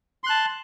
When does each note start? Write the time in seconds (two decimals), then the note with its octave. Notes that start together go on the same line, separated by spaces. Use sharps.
0.24 C6
0.27 F#6
0.29 A5